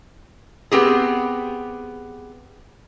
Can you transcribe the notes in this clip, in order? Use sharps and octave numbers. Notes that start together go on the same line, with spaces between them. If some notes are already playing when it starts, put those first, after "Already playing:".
B3 C4 G4 G#4